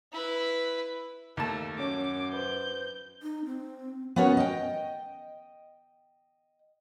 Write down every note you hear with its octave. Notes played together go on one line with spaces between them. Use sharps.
E4 B4
D#2 A3 A5
F#2 C#4 C#5 D6
B4 C5 G6
D#4
C4
B3 C#4 F#4 A#4 C#5
D#5 G5